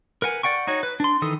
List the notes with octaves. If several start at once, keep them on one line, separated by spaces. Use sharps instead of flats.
A#4 B4 F#5 G#5
D5 F#5 G5 C#6
D#4 F#4 C#5
B4
D4 C6
D#3 E3 A4 D#6